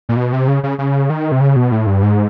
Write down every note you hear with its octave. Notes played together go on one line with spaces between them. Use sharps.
A#2
B2
C3
C#3
C#3
C#3
D#3
C3
C#3
B2
A2
G2
G#2